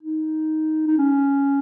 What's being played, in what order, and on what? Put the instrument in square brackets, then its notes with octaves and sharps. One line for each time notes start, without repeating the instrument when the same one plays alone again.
[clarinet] D#4
D#4
C#4